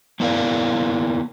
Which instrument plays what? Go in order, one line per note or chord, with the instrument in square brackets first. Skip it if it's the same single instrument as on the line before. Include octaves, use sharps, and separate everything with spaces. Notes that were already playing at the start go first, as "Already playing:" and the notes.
[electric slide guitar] A#3 B3 E4 A#4 D5 F5